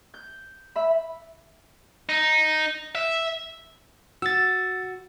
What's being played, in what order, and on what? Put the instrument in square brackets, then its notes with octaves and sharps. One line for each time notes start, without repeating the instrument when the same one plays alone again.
[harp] G6
E5 B5
[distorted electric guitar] D#4
E5
[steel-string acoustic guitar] F#4 [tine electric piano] E6 A6